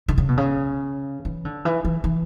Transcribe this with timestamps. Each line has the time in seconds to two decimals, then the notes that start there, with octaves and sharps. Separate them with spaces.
0.08 D3
0.18 C#3
0.28 B2
0.37 C#3
1.25 E3
1.45 D3
1.65 E3
1.85 E3
2.04 E3